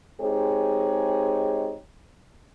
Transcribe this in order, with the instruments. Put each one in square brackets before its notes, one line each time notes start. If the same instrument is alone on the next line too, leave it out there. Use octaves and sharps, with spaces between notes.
[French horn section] G#3 C4 D#4 G4 G#4 C#5